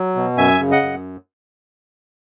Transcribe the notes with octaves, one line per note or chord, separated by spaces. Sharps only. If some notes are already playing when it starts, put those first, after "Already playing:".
Already playing: F#3
B2
F#2 E5 G#5
C#3
D#5 F#5
F#2